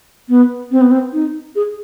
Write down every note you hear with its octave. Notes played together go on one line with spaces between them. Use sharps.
B3
C4
B3
C4
D#4
G#4